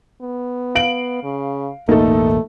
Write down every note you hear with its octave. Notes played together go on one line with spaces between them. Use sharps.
B3
F5 D7 F#7
C#3
E1 A1 A3 A#3 D#4 A4